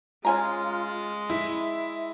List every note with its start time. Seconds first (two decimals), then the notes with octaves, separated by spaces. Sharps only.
0.25 G#3 C#4 F4 G#5 A#5
1.30 E4 E5